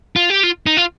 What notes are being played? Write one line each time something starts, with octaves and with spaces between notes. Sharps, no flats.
F4
G4
F4
D#4
F4